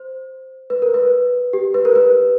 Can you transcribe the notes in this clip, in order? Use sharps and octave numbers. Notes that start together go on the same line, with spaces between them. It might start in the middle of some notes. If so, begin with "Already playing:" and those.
Already playing: C5
B4
A#4
B4
G4
B4
A#4
B4